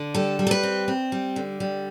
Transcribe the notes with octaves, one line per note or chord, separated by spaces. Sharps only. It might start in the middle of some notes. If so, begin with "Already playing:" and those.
Already playing: D3
G3 A4
G3
A4
B4
C4
C4
G3
D3
G3